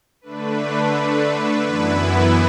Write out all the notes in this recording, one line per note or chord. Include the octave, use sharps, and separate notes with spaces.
D3 A3 D4 B4
F#2 E3 B3 E4 B4